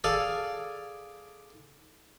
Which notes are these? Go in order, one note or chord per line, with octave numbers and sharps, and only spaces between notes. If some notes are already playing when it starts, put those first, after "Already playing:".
G#4 A4 D5 F5 G#5